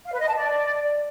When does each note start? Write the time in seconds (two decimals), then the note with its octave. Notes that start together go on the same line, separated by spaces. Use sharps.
0.06 F5
0.13 B4
0.21 D#5
0.28 A5
0.36 D5